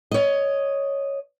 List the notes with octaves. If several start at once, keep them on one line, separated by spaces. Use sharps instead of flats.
C#5 D#5